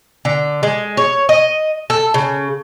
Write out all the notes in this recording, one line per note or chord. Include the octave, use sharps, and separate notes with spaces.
D3
G#3
C#5
D#5
A4
C#3